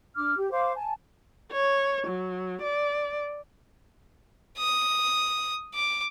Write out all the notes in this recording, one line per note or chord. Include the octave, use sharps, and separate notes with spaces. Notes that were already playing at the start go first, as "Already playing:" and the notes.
D4 D6 F6
G4
C5 F5 D6
G#5 A5
C#5
F#3
D5
D#6
D6